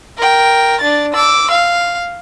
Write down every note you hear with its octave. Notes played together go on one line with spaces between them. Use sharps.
A#4 G5
D4 A6
D6 E6
F5